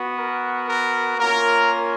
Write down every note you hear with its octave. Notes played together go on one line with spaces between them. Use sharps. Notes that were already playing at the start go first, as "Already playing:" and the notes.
Already playing: B3 F#4
A#4
A#4
A#3 C#4 F4 A#4